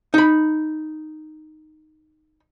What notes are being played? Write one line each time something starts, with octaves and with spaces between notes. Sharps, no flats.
D#4 B5